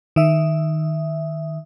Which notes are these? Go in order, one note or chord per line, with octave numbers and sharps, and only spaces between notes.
D#3 E5